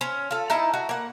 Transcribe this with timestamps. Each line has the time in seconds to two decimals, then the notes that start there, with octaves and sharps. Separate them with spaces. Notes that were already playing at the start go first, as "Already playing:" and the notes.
0.01 C#4 C5
0.31 F4 A4
0.50 D#4 E4 A5
0.74 F#4
0.89 A#3 F#5